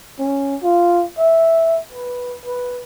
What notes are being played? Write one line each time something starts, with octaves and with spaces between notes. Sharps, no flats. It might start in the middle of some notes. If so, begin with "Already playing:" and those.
C#4
F4
E5
B4
B4